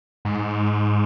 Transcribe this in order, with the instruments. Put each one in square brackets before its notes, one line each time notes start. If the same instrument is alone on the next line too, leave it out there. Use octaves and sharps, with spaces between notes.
[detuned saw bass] G#2